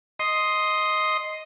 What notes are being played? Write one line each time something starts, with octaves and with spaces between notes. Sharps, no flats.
D#5 C6